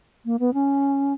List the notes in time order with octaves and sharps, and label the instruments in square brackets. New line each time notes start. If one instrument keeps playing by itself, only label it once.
[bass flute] A#3
B3
C#4